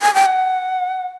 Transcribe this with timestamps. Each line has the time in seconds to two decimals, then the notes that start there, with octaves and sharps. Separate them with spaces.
0.02 G#5
0.14 G5
0.26 F#5